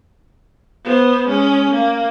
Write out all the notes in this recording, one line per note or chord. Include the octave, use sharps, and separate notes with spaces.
B3 C5
G#3 C#4
A#3